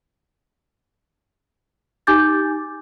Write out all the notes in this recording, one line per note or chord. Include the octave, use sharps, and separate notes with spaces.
D#4 G4 G#5 D6 G6 A6